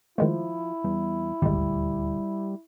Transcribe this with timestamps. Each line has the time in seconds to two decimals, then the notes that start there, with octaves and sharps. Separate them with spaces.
0.18 D#3 F3 G#3 A3 E4
0.84 E2 G3
1.42 D#1 G#1 D2 G3 G#3